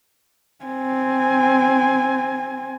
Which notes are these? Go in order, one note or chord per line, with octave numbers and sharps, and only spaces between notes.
C4 G#5